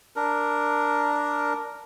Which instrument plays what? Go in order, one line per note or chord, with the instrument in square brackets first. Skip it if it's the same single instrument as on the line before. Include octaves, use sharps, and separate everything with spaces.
[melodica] D4 A#4